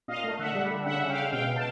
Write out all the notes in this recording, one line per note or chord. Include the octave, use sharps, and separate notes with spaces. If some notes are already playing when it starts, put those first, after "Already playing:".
A#2 D#5 F5
A3
D3 E5 F#5
G3
D3
C#3 E5 F#5
C#3
F5 G5
G#3
B2 F5 G5
B2
A5